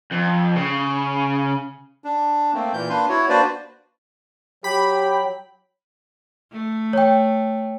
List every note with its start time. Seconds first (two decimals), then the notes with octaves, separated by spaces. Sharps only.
0.11 F2
0.56 C#3
2.04 D4
2.54 A3 A#3 C4
2.74 A#2 E3 G6
2.89 A#3 D4 B4 C6
3.09 E4 F#4 C#5
3.29 A#3 D4 F#4 B4 C5 D5
4.64 F#3 G4 G5 B5
6.52 A3
6.93 C#5 G5